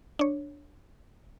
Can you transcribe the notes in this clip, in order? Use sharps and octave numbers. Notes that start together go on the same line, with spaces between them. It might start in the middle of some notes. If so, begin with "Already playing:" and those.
D4 C#5